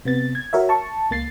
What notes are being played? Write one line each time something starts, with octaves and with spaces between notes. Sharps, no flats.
C3 B3 A6
G#6
F#4 A#4 C#5 E5
A5 C#6
C#2 A#3 A6 C7